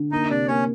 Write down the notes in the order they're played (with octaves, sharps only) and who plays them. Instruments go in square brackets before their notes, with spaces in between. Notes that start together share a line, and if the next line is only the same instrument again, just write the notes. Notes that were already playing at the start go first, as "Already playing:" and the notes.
Already playing: [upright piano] D3
[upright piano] A#3 [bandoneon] D#4 D#5
[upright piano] C3 [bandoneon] D4 D5
[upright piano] A#3 [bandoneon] C#4 C#5